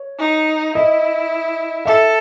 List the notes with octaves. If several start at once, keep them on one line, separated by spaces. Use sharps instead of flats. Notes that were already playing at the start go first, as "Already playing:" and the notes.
Already playing: C#5
D#4
E4 D#5
A4 E5